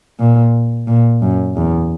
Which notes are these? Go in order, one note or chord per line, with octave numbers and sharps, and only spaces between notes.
A#2
A#2
F#2
E2